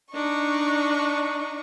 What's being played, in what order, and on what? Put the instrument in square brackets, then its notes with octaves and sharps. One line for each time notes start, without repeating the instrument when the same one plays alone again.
[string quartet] D4 D#4 C#6